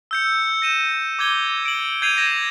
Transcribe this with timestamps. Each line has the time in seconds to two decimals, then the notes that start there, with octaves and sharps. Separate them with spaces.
0.11 E6 G6 C#7
0.62 A#6 D#7 E7
1.19 D6 G6 G#6 G7
1.65 D7 F#7
2.02 G6 G#6 C7 D#7 F7 F#7
2.17 G#6 A#6 E7